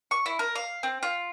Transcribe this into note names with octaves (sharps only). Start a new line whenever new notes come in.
C#6
E4
A#4
F5
C4
F4